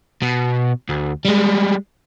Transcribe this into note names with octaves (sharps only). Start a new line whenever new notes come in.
B2
D2
G3 G#3